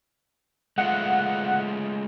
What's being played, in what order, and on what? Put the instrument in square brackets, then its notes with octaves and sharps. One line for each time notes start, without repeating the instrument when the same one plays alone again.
[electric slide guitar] G#3 A3 F4 [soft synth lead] F#5